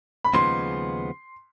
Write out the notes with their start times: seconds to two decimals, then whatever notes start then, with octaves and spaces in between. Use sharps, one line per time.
0.24 B5
0.34 D#2 C#3 F3 G#3 B3 C6